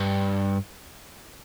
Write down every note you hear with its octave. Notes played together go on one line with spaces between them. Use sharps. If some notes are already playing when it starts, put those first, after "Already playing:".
Already playing: G2